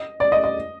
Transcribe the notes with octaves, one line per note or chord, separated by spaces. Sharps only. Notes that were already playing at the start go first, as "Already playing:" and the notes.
Already playing: D#5
D5
D#5
D#5